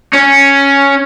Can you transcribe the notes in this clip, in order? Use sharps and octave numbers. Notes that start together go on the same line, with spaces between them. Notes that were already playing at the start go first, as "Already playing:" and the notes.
C#4